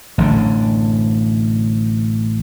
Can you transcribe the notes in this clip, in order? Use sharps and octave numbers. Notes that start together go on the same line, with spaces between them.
A1 D3